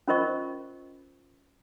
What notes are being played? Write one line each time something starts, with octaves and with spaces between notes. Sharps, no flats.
C#4 F4 A#4 C5 D#5 C#6